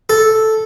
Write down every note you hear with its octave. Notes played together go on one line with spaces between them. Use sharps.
A4